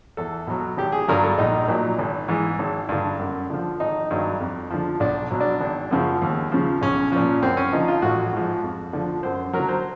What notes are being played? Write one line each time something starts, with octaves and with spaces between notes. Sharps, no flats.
E2 A4
B2 F#3
G#1 G4
G#4
G2 D3 F#3 A#4
A4
A#1 D#4
A#2 F#3
G#1
G#2 E3
G#1
G2 D3
F#2
D3 F3
G#1 D#4
G2 D#3 F#3
F2
D3 F3
B1 D4
B2 F#3
D4
G#1
F#2 C#3 F3
D#2
C#3 F3
B1 C#4
A#2 F3 C#4
F#2 C4
C#4
D3 F3 D#4
F4
A1 F#4
G#2 F3
F2
D3 F3
F#2 C5
D3 F#3 A#4
C5